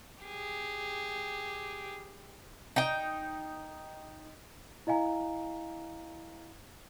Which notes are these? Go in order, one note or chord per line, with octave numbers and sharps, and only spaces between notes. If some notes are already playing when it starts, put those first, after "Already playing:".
G4 G#4
D#4 G5
E4 D#5 F5 G#5 A#5